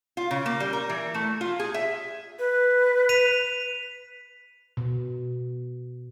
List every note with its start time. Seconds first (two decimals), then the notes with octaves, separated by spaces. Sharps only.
0.17 F4
0.31 C#3
0.46 A#3
0.60 G3
0.73 A#4
0.89 E3
1.14 A3
1.41 F4
1.60 G#4
1.74 E5
2.39 B4
3.09 B6 D#7 F7
4.77 B2